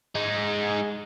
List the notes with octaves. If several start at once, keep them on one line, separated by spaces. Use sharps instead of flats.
G#3 D#4